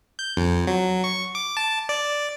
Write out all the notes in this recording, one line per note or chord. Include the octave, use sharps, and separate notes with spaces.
G6
F2
F#3
C#6
D6
A5
D5